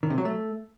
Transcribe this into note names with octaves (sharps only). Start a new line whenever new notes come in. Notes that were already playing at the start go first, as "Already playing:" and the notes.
D#3
C3
F#3
A3